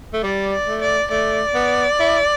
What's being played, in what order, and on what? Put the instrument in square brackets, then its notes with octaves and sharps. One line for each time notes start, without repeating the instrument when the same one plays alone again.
[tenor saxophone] A3
[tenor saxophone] G3 [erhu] D5
[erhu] D5
[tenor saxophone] A3
[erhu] D5
[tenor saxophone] A3 [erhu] D5
[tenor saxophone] B3
E4